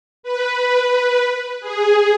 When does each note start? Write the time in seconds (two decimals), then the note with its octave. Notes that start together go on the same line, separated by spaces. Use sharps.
0.23 B4
1.61 G#4